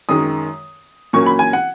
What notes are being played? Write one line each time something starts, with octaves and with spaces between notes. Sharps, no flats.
F#2 D#3 G#3 D#6
A#2 F#3 A#3 C#4 C#6
B5
G#5
F#5